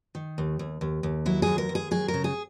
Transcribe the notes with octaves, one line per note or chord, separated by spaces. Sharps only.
D#3
D#2
D#2
D#2
D#2
F#3 E4
D#2 G#4
A#4
D#2
G#4
F#3 G#4
A#4
C#3
G#4